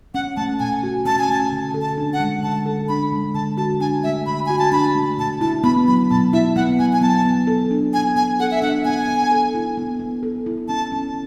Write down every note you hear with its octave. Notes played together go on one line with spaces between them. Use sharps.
C#4 F#5
A3 A5
B2 G#5
F#4
C#4 A5
G#5
A3 A5
D3
A4
A5
D4
F#5
G#3
D3 A5
A4
D4 B5
G#3
D3 A5
F#4 A5
D4 G#5
A3 E5
D3 B5
F#4 G#5
A5
D4 B5
A3
B2 A5
E4 A5
B3 B5
F#3 B5
B2 A5
E4 E5
B3 F#5
F#3 G#5
G#5
B3 A5
B3
A4
D4
B3 G#5
B3 G#5
A4 F#5
E5
D4 F#5
B3 G#5
B3
A4
E4
B3
B3
A4
E4
C#4 A5
C#4